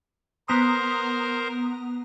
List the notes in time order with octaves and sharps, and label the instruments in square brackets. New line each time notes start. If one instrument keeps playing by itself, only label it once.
[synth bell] B3 A#5 D#6 [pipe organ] A#4 C5